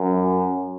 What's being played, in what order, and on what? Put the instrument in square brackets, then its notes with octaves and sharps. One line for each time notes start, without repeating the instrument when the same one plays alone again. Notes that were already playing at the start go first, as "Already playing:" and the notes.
Already playing: [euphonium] F#2